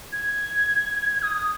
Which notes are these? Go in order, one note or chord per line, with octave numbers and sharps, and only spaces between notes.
G#6
D#6